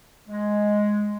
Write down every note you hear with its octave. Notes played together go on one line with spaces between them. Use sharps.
G#3